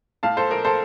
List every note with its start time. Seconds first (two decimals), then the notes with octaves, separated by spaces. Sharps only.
0.23 A2 F5 A5
0.37 A4 C5
0.51 A#1 A#4
0.65 A4 C5